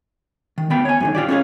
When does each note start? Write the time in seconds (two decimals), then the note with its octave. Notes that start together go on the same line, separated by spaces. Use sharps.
0.58 D#3
0.70 D2 B3 G5 B5
0.85 C#5 G#5
1.00 F#2 D3 D#3
1.15 F4 G4 D5
1.28 C#4 F4 G#4 C5 C#5